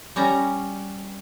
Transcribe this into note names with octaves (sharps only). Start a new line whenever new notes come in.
G3 C#4 A#5